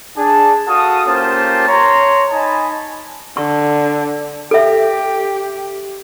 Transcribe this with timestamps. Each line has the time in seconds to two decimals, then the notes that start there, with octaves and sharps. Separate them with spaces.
0.17 D4 G#4 A5
0.68 F#4 A4 F5 A5 D#6
1.07 A#3 C#4 F4 G4 C5 A5
1.68 C#5 A#5 C6
2.32 D#4 D#5 G#5 A5 B5
3.37 D3 C#6
4.51 G4 A4 E5